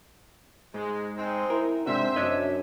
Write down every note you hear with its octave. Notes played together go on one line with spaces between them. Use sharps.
G#2 G#3
G#3 C4 D#4
E4 A#4
G#2 C3 D4 F#4 C5 E5
F#2 D4 C#5 D#5